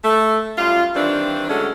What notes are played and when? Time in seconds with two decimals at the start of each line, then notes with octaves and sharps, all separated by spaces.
0.04 A3
0.58 F#2 G3 F4
0.95 D#3 E3 G3 C4 D4
1.49 D3 F#3 G#3 A3 C#4